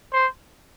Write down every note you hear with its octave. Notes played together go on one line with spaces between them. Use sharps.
C5